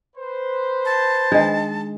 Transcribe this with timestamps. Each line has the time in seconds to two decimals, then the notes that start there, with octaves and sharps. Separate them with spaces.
0.16 B4 C5
0.85 A5
1.32 D#3 G#3 D4 D#5